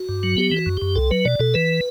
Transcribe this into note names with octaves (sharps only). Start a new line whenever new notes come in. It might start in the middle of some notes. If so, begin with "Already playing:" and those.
Already playing: F#4
G2
F#3
B3 G4
E3
F#4
F#2
F#2 G4
C2 A4
F#3 B4
B2 D5
B2 A4
E3 B4